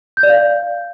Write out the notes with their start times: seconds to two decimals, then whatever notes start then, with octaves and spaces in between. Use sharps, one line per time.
0.17 G6
0.23 D5
0.29 F5